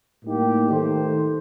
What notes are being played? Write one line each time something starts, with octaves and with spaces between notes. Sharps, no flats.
A2 G3 A#3 D#4 G4
D#3 A3 D#4 A4 C5